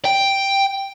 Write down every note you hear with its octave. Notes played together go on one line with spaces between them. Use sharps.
G5